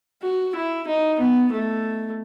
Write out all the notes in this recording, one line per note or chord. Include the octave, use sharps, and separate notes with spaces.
F#4
E4
D#4
B3
A3